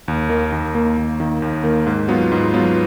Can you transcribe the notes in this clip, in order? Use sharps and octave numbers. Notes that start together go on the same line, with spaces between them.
D#2
D#3 A#3
D#2
D#3 A#3
D#2
D#3 A#3
D#2
D#3 A#3
G#2
F#3 B3 F4
G#2
F#3 B3 F4